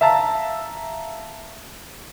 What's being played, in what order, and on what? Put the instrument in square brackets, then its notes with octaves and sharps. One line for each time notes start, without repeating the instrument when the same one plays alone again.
[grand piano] E5 F5 A5 A#5